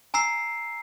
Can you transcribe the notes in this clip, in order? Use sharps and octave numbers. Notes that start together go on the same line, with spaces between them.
G#5 A#5 E6 C7